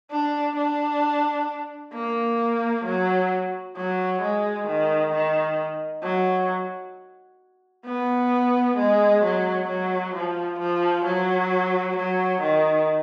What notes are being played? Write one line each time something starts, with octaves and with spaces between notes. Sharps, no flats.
D4
D4
A#3
F#3
F#3
G#3
D#3
D#3
F#3
B3
G#3
F#3
F#3
F3
F3
F#3
F#3
D#3